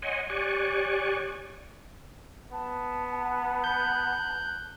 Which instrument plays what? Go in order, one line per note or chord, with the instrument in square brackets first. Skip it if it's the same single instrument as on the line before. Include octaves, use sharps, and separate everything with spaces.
[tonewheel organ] C#5 D#5 F#5 G#5 C6
G4 C#5 D5 G#5 C#6 F#6
[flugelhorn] B3 [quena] A5
[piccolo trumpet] F#6 [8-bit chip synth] G6